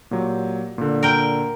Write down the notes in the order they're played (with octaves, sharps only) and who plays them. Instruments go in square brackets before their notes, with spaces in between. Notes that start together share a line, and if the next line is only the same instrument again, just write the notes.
[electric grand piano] A#2 F#3 G4
A#2 D3
[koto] A#4 G5